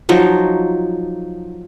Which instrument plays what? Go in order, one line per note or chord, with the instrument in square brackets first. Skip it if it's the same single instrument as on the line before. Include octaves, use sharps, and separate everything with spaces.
[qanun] F3 F#3 D#4